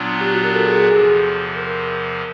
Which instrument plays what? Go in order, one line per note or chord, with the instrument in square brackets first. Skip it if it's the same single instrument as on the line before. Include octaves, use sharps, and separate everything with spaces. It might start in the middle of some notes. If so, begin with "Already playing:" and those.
Already playing: [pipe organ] A#2 F#3 B3 D4 F4
[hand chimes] G4
F#4
A#4
A4
G#4
G#4
[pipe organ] E2 C3 F3 [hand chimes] A4
[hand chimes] A#4